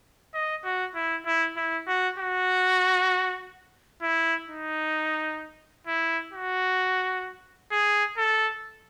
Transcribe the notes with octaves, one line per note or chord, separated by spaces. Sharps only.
D#5
F#4
E4
E4
E4
F#4
F#4
E4
D#4
E4
F#4
G#4
A4